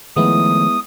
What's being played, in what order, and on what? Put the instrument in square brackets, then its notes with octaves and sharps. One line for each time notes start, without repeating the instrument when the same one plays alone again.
[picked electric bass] D#3 F3 A3 [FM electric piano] G#3 B3 E4 [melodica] D#6